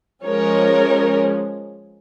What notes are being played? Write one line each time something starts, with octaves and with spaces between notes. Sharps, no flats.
F3 G#3 C#4 A#4 C#5